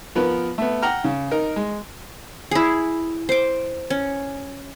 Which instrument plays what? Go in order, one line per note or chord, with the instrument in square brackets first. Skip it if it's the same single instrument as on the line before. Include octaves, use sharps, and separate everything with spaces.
[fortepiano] F3 B3 A#4 B4
A3 B3
F#5 G5 A#5 F6
C#3
D#4 A#4
G#3
[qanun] E4 G#4
C5 D6
C#4